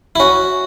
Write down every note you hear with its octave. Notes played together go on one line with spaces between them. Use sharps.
E4
C#4 F#4